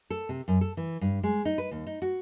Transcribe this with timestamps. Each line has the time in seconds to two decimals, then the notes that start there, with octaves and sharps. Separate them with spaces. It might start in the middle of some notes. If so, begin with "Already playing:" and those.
0.10 A4
0.29 C3
0.48 F#2
0.61 A4
0.77 E3
1.01 G2
1.23 G#3
1.45 D#4
1.58 B4
1.71 D#2
1.87 D#4
2.02 F#4